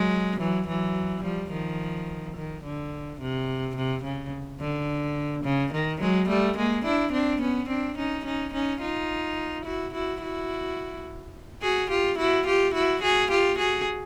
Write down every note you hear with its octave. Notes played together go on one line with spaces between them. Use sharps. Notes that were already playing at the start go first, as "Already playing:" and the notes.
Already playing: F#3 G#3
E3 F#3
E3 F#3
F3 G3
D#3 F3
D#3
D3
C3
C3
C#3
D3
C#3
D#3
F#3 G#3
G3 A3
G#3 A#3
D4 E4
C4 D4
B3 C#4
C4 D4
C#4 D#4
C#4 D#4
C#4 D#4
D#4 F4
E4 F#4
E4 F#4
E4 F#4
F#4 G#4
F4 G4
E4 F#4
F4 G4
E4 F#4
F#4 G#4
F4 G4
F#4 G#4